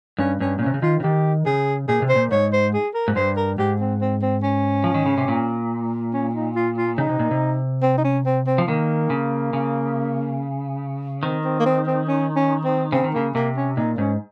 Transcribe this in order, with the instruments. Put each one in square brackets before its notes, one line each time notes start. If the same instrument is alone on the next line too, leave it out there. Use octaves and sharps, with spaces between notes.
[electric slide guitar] G2 [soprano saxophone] C#4
[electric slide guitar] G2 [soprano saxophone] C#4
[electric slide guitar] A#2 [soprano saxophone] C#4
[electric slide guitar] C3
C#3
[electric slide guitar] D#3 [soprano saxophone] F4
[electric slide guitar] C#3
[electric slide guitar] D#3 [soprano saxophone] G4
[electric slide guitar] C#3 [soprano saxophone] G#4
[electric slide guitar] A#2 [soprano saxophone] G#4
[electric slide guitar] C3
[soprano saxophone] C5
[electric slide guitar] A#2
[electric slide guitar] G#2 [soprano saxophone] C#5
[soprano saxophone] C5
G#4
A#4
[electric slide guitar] G#2
[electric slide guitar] G2 [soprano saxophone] C5
[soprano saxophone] A#4
[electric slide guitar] G#2 [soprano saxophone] G4
[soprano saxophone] C4
C4
C4
C#4
[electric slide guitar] F3
D#3
C#3
C3
A#2
[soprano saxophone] C#4
D#4
F4
F4
[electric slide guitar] C#3 [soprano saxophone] D#4
[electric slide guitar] C3
A#2
C3
[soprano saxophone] C4
D#4
C#4
C4
C4
[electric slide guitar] F3
[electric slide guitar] D#3 [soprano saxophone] A#3
[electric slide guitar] C#3
C#3
[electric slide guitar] D#3 [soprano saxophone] C4
[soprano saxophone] C4
A#3
C4
C4
C#4
C#4
C4
[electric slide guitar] C#3 [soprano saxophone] C4
[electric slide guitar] D#3
[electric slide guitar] C#3 [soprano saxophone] A#3
[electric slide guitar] C3 [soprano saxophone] A#3
[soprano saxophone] C#4
[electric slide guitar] A#2 [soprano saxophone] D#4
[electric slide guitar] G#2 [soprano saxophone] C#4